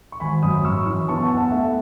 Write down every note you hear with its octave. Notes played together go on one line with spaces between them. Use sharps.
C#6
G#1 G#5 B5
F#2 B5 D#6
F#2 C#6 E6
E3 C#6 E6
B3 A5 C#6
F#5 A5
B3
F#5 A5
A3 E5